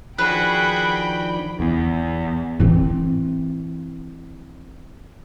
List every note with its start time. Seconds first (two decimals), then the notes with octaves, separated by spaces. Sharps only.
0.18 D#3 F3 D4 F#4 G#4 B4 G5 B5
1.60 E2
2.60 E3 C4